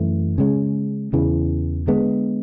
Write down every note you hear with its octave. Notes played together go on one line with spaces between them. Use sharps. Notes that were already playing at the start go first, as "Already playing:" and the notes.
Already playing: F#2 E3 A3
C#3 G#3 C#4
E2 C#3 E3
D3 G#3 B3